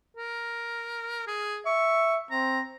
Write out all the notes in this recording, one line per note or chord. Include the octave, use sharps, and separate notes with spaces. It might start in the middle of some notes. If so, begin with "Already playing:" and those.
A#4
G#4
E5 C#6
C4 A#5